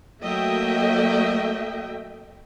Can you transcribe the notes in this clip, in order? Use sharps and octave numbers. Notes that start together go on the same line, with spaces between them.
F#3 A3 A#3 D#5 E5 G5